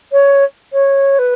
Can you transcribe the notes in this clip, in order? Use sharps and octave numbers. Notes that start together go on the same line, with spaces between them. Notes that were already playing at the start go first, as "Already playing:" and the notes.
C#5
C#5
B4